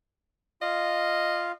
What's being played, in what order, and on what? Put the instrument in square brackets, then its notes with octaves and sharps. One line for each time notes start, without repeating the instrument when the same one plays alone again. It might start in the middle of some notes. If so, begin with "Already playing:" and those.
[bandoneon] F4 F5 [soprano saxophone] D#5